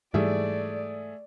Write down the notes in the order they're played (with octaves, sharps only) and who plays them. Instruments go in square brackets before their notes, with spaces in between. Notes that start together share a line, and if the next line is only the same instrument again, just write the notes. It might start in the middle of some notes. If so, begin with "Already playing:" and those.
[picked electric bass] G#2 E3 G3 [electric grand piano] A3 G#4 E5 [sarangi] D5